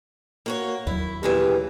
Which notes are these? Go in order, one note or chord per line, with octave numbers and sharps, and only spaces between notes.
A#3 F#4 C#5
D#2 F#3 E4
A#2 C#3 E3 G4